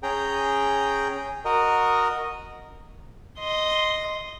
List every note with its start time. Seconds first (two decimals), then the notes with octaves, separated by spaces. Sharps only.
0.03 C#4 G#4 G5 A#5
1.45 F#4 A#4 D#5
3.38 D#5 C6